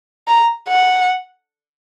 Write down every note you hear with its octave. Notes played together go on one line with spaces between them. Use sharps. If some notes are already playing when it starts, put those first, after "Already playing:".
A#5
F#5